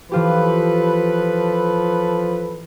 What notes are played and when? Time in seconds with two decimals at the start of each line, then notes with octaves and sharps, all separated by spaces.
0.12 E3 F3 F4 G4 A4 B4